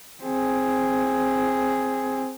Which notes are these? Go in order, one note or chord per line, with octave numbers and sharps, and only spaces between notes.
C4 G#4